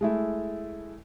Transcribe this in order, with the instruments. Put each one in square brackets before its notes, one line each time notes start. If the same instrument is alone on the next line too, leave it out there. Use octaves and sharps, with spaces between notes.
[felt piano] G#3 A3 E4